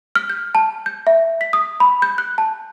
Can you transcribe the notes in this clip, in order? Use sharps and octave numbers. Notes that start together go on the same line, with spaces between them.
F6
G6
A5
G6
E5
B6
D#6
B5
G6
F#6
A5